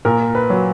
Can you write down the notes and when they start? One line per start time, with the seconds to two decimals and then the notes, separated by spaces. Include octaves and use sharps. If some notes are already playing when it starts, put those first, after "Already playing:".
0.05 A#2 A#4
0.35 B4
0.50 F#3